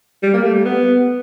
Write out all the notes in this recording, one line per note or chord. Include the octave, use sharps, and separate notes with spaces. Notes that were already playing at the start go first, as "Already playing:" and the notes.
G3
A#3
A3
G3
B3